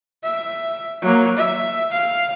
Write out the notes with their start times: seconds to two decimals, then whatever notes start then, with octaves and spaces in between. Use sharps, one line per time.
0.24 E5
1.01 F#3 A#3
1.37 E5
1.92 F5